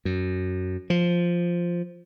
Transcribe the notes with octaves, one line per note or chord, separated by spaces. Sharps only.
F#2
F3